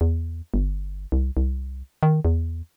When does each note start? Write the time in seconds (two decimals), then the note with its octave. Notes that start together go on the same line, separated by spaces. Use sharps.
0.01 E2
0.54 G1
1.12 C2
1.37 C2
2.03 D#3
2.25 E2